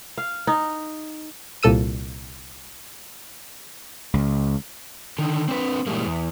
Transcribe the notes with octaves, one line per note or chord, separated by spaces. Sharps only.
F5
D#4
C2 A#2 A4 E6 D#7
C#2
D3 D#3
C4 D4 B4
A#2 E3 G3 G#3 A#3
E2